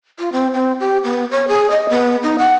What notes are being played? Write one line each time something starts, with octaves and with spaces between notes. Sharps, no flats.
F4
C4
C4
G4
B3
C#5
G#4
D#5
B3
D#4
F#5